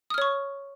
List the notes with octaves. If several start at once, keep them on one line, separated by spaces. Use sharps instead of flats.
C#5 C#6 D#6 F6